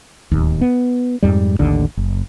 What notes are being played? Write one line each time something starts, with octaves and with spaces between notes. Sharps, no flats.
D1 D#2
B3
F2 G#2 G3
A1 D#2 D3
F#1